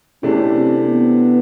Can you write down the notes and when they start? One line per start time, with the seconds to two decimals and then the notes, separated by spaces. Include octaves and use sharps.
0.23 C3 E3 A3 C#4 D4
0.53 C4
0.85 B3